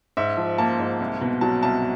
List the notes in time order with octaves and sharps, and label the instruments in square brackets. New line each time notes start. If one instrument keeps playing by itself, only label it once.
[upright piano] G#2 E5
F3
A#3 A5
G#2
C2
B2
F#3 A5
C2 A5